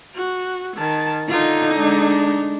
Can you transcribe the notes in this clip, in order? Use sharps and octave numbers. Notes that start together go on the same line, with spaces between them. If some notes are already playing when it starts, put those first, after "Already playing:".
F#4
D#3 A5
D3 D#4 F4
G#3 D4